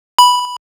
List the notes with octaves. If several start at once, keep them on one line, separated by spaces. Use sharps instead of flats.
B5